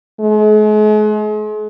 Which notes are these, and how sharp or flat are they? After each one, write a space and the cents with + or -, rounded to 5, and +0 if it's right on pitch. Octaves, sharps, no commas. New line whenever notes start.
G#3 +40